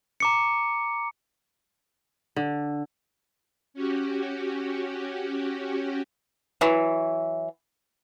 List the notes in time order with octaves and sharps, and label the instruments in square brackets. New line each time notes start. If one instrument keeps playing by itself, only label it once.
[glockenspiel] A#5 D6 C#7
[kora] D3
[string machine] C#4 F#4 G4
[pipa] E3 F#3